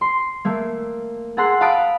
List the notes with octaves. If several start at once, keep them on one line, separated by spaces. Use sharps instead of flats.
C6
A3 A#3
G#4 A4 F#5 A#5 C6 F#6
F5 A5 B5 D#6 F#6 D7